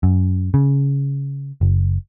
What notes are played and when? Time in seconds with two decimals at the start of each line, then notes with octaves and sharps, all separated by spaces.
0.03 F#2
0.54 C#3
1.61 F#1